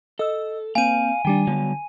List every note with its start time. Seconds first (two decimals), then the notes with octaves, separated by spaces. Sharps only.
0.19 A4 D#5 E6
0.75 A#3 C4 F5 G#5 D#7
1.25 D#3 G3 D4 G5
1.47 D3 F#3 G3 B3